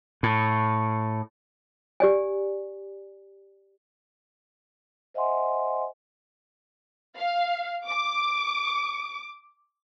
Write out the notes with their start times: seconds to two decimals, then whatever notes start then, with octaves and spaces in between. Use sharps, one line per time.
0.23 A2
2.00 G4 D5 G#5
5.14 C5 D#5 E5 F#5 G#5 C6
7.17 F5
7.86 D6